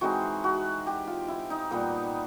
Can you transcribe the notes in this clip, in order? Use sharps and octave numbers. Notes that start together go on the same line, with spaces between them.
E3 G#3 C4 D#4 F#4
F#4
G4
F4
E4
D#4
A#2 G3 B3